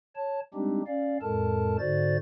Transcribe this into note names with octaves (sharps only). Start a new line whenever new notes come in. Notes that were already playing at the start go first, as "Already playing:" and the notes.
C#5 A5
G3 G#3 C4 D4 D#4 G4
C#4 D5 F5
F2 A2 G#3 A4 A#4 A5
G#2 D3 F#4 C5 D5 A6